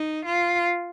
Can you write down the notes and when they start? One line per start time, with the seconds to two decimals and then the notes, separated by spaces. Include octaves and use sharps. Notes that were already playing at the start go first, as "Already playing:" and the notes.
Already playing: D#4
0.25 F4